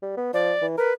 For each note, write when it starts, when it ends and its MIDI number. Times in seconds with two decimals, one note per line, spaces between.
0.02 0.15 55
0.17 0.33 59
0.33 0.53 53
0.33 0.66 74
0.62 0.75 52
0.78 0.91 70
0.78 0.93 71